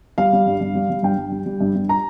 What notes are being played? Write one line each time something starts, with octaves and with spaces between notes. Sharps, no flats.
G3 F5
G3
G2
G2
G3
G3
G2 G5
G2
G3
G3
G2
G2
A#5